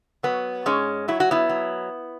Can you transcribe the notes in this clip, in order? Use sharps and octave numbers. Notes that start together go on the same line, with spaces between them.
F#3 B3
G#2 G#3 C#4
F#3 E4
F#4
B3 E4
F#3